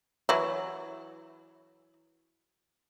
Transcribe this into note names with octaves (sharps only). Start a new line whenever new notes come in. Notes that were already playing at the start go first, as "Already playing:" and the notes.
E3 F#3 E4